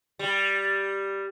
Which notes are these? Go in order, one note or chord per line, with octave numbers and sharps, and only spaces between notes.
G3